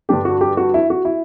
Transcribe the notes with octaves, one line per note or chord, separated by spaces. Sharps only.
G2 D3 G3 D4 G4
F#4
G4
F#4
E4
F#4
E4